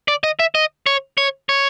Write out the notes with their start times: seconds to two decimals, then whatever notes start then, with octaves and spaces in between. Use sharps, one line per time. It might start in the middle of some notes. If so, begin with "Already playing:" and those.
0.08 D5
0.24 D#5
0.39 E5
0.55 D#5
0.86 C#5
1.18 C#5
1.49 C#5